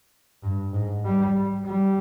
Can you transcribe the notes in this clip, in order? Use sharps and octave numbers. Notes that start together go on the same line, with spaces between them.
G2
G#2
G3
G3